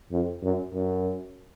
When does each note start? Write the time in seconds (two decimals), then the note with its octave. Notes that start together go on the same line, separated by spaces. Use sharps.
0.11 F2
0.43 F#2
0.74 F#2